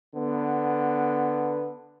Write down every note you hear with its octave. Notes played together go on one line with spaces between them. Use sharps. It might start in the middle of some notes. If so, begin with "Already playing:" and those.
D3 B3